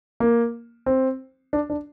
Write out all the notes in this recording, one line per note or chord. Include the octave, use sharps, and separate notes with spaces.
A#3
C4
D4
D4